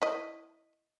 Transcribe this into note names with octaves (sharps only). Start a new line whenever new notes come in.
E4 D#5